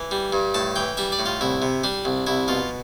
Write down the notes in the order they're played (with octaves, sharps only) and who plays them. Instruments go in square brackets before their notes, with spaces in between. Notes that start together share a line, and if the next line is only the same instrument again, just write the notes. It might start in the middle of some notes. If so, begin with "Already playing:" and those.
Already playing: [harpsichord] E3
G3
G2
A2 A5
E3 G5
G3 E5
D5
A2
F4
C2 E4
C3
G3 D4
C2
C2 E4
B2 F4